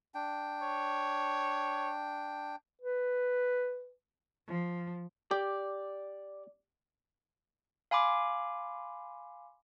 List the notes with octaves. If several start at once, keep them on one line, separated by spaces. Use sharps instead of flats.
D4 G5
C#5
B4
F3
G4 D5
F5 G#5 B5 C6 D6